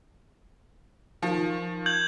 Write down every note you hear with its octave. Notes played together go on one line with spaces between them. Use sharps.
D#3 F3
G6 G#6 F#7